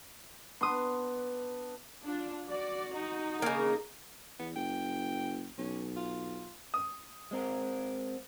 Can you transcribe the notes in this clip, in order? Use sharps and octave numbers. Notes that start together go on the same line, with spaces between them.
B3 D4 C6 D#6
D4 F4
F#4 D5
D#4
C#3 A#3 A#4
E2 B3
F#1 G5
B1 C#4
F4
D#6
G#3 C4 A#4